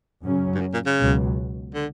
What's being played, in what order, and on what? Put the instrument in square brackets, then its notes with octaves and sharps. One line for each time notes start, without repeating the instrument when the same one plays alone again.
[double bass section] F#2 C#3 F#3 C#4
[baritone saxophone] G2
F#2
A#2
C#3
[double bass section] C#2 B2 F#3
[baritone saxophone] D3